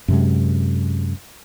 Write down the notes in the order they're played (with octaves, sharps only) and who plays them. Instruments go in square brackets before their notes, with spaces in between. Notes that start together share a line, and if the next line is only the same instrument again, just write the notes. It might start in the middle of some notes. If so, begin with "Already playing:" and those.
[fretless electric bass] F#2 C3 G#3